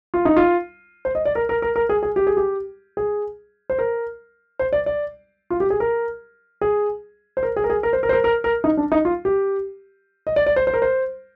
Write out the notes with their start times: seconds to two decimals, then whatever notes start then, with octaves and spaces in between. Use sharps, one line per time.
0.14 F4
0.25 D#4
0.36 F4
1.05 C5
1.15 D#5
1.25 D5
1.35 A#4
1.49 A#4
1.62 A#4
1.76 A#4
1.89 G#4
2.03 G#4
2.16 G4
2.27 G#4
2.37 G4
2.97 G#4
3.70 C5
3.79 A#4
4.59 C5
4.73 D5
4.86 D5
5.50 F4
5.60 G4
5.70 G#4
5.80 A#4
6.61 G#4
7.37 C5
7.43 A#4
7.56 G#4
7.64 A#4
7.70 G#4
7.83 A#4
7.93 C5
8.03 A#4
8.09 C5
8.13 A#4
8.24 A#4
8.44 A#4
8.64 D#4
8.77 D4
8.92 D#4
9.05 F4
9.25 G4
10.27 D#5
10.36 D5
10.47 D5
10.56 C5
10.67 C5
10.74 A#4
10.82 C5